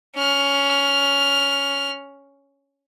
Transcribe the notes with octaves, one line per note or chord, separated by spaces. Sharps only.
C#4 F6